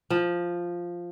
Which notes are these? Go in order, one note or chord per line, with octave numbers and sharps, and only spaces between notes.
F3